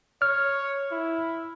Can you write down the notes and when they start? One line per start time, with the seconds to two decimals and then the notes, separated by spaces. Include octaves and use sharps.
0.22 C#5 F6
0.92 E4